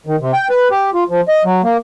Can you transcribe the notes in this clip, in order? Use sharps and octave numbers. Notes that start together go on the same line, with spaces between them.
D#3
C3
G5
B4
G4
F4
F3
D#5
F#3
A#3